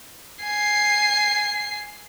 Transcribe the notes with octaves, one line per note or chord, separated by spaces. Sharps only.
G#5 C7